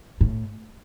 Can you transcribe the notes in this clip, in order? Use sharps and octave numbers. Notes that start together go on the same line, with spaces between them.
A2